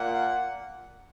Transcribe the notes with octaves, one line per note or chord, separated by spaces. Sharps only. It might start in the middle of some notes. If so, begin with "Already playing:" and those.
Already playing: A#2 A#3 F#5